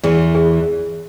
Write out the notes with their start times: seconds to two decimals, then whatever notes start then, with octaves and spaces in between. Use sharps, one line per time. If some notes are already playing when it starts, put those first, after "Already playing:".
0.03 E2 E3 G#4
0.35 G#4